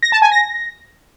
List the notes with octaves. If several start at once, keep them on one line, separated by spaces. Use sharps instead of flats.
A#6
A5
G#5
A#6